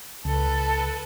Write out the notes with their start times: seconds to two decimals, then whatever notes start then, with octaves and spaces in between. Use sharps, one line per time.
0.25 C#2 A4 B4